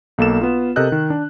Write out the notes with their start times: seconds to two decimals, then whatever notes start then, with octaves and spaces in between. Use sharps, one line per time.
0.18 B1 A#3 A4 E7
0.41 B3 F4
0.76 C3 A4 A#4 D#5 F#6 G6
0.92 D#3
1.10 D4